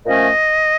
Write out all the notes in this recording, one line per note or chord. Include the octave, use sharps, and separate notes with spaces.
A#2 F3 A3 C#4 D#5